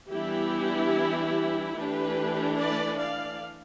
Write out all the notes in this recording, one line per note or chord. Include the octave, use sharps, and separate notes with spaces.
E3 G3 B3 D4 E4 G4
E3 A3 D4 G4 B4
B4 D5
D5 F5